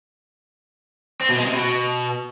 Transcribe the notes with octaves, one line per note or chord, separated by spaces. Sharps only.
C4
B2
G#3
C3
B2